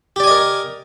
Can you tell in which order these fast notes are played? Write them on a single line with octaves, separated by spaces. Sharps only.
G4 D5 G#5 D#5 A#4